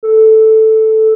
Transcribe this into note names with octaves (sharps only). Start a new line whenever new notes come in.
A4